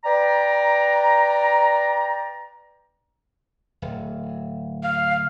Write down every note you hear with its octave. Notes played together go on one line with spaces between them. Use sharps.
B4 D5 G5 A#5
D1
F5